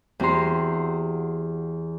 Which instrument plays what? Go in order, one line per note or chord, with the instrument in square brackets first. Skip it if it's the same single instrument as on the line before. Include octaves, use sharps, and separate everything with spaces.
[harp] E2 C4 F#4 G4 A#5 C6